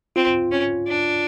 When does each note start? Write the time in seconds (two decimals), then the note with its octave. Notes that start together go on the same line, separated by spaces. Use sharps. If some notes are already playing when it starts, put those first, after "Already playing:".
0.16 C4 F4
0.52 C#4
0.87 D4